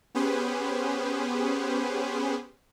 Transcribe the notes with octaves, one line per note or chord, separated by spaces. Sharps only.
B3 C#4 G4 G#4 B4 C5